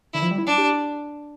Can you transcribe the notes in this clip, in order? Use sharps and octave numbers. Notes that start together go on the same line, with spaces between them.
D3 E4
F3
G3
E4
D4
G4